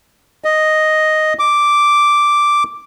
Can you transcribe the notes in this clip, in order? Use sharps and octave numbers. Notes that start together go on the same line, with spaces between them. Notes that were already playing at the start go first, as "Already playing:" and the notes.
D#5
D6